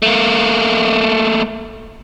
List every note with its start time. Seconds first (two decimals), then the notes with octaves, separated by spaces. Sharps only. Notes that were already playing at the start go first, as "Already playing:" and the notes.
0.02 A3 A#3